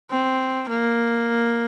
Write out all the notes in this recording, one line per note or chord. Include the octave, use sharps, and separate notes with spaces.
C4
A#3